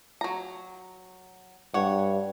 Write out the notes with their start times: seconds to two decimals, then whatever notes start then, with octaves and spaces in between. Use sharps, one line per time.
0.21 F#3 A#5
1.74 G2 C#5 F#5